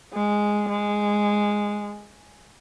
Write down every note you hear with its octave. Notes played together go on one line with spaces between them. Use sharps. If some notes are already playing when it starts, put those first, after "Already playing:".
G#3
G#3